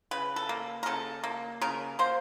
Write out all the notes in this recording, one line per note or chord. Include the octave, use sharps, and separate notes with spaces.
C#3 B4
A4
A#3
A#4
C#3 A4
A#3
C#3 A#4
A#3 C5